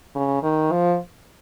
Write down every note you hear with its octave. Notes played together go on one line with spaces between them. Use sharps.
C#3
D#3
F3